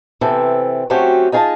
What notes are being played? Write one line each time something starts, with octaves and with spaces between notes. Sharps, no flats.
C3 E3 C4 A4
F#3 A3 C4 C#4 F#4 G4
D#4 F4 G#4 B4 D#5 A5